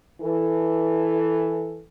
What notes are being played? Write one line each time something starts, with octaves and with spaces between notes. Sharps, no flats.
E3 A4